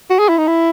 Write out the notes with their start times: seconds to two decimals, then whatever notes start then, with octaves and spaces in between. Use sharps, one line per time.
0.10 F#4
0.19 G#4
0.29 E4
0.38 D#4
0.47 E4